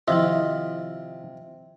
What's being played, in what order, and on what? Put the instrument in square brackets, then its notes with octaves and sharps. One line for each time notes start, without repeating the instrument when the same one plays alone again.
[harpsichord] C3 [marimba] D#3 F3 E4 [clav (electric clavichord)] F4 D#5 E5